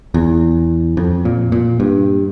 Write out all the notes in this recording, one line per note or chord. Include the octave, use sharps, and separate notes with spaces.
E2
F2
A#2
A#2
G2